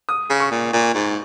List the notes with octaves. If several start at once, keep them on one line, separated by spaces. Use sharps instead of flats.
D#6
C#3
C#6
A#2
A#2
G#2